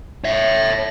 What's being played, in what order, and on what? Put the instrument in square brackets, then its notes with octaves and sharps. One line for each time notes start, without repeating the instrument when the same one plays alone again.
[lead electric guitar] C#5 E5